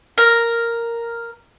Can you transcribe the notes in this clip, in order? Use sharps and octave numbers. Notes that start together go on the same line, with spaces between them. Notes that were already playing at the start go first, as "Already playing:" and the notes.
A#4